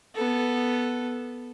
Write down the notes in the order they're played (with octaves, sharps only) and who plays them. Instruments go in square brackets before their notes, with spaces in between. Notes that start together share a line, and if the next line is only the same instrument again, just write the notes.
[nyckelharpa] B3 A4